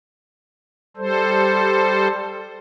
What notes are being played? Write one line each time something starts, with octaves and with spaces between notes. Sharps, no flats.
G3 A4 C5